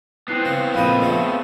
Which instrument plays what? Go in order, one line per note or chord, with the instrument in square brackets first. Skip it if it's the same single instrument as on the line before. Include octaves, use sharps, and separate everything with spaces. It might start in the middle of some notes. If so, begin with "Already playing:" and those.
[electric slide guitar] B3 C4 [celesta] E4 F#6 C7
[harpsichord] C#3
[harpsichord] F2 A#2 D#5 [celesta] F5 B5
[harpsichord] C#3 A3